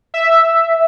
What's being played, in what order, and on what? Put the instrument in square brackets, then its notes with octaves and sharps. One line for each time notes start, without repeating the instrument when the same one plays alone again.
[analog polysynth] E5